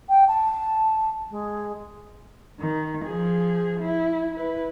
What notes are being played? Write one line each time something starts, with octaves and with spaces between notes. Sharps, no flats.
G5
A5
G#3
D#3
F3 G#4
E4
E4 B4